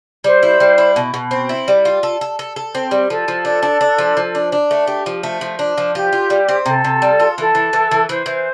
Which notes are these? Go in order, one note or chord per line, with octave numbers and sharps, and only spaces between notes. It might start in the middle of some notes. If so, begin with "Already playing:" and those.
G3 C5
E4
G3
E4
B2
B2
C4
E4
G3
F4
A4
A4
A4
A4
C4
G3
F3 A4
F3
D4
D4
D4
F3
F3
D4
D4
A3
G4
F3
A3
F3
D4
F3
F4 G4
F4
G3
C4
C3 A4
C3
G3
F4
E3 A4
E3
E3
E3
E3 C5
E3